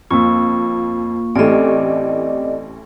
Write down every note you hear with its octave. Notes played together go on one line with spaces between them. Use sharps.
F2 A#3 F4 C#6
A1 E3 A3 C4 G4 D5 D#5